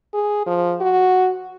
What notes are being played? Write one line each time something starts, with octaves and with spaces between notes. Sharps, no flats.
G#4
F3
F#4